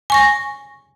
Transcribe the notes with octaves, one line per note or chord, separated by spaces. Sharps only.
G#5 C#6 A#6